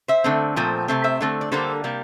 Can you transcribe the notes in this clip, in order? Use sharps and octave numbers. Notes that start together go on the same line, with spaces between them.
C5 E5
D3 A3 C4
A#2 F3 A3 C4
C3 F3 A3 C4
C5 E5
D3 A3 C4
D5
D3 G3 A#3 A4 C5
C3 G3 A#3